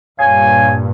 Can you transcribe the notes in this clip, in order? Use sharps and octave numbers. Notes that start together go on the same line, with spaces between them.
G2 A#2 C#5 F5 G#5